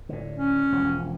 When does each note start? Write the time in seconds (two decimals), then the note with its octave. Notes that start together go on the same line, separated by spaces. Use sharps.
0.09 A2 D3
0.37 C#4
0.72 E1 F3